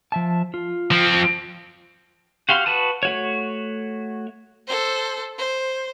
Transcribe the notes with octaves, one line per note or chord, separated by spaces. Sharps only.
F3 E5 A5
F4
F3 C4
F#4 G4 F5 C6
F#4 B4 A5 D#6
A3 F#4 C#5
A4 C5
C5